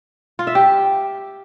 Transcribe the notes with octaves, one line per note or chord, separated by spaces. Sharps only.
F4
E5
G4